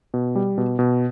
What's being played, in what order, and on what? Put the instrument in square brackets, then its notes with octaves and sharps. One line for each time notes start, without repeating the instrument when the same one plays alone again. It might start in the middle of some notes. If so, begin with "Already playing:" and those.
[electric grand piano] B2
G3
B2
B2